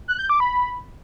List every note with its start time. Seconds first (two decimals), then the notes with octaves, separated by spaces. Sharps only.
0.08 F#6
0.19 G6
0.29 D6
0.40 B5